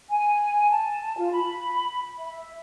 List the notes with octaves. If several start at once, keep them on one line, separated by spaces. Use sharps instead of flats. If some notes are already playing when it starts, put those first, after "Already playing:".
G#5
A5
F4
B5
E5